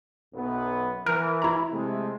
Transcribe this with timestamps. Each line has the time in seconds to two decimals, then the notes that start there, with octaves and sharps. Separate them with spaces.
0.34 B1 F#2 B3
1.06 E3 A#4
1.42 E4 A#5
1.71 C3 G#3 A3